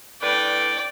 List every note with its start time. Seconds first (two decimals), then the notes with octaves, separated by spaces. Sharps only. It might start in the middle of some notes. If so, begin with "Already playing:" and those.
0.22 A2 D4 B4 D5 G5